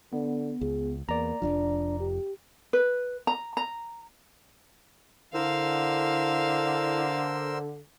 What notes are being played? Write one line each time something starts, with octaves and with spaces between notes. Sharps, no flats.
D3 B3
C#2 G#4
E2 A#3 D5 A#5
F1 F2 F3 D4
G4
B4
A#5
A#5
D3 E4 A#4 C5 F5 E6